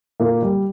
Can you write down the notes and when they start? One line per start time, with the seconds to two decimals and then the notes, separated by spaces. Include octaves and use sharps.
0.20 A#2 A#3
0.42 G3